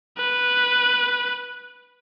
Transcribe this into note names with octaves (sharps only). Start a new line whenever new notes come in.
B4